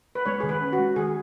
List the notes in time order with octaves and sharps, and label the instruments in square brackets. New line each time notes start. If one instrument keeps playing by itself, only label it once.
[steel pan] B4
[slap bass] G#3 [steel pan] C#5
[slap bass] D#3 [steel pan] G#4
[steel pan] B4
[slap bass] C#4
[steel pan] F#4
[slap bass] G#3
[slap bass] D#3 [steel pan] G#4